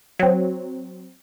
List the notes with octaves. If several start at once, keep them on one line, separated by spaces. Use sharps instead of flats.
F#3 C4